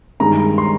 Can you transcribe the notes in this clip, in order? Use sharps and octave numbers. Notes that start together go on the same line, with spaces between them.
G2 D#3 G#3 A#5
C6